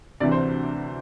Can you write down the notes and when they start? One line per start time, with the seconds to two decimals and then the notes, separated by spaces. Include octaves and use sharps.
0.20 D2 C3 E3 D5
0.31 C5